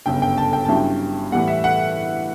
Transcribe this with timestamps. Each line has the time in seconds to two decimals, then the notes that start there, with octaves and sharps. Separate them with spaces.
0.06 G1 F#2 C#3 G5
0.22 G5
0.38 A5
0.53 G5
0.65 G2 F#3 C#4 E4 A5
0.76 G5
1.32 A2 E3 G3 F#5
1.48 E5
1.64 F#5